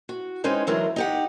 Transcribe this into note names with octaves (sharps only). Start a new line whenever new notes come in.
F#4
G#3 C4 C#4 D#4 B4
D3 E3 F#3 G#3 A3 A#4
D#4 G4 F#5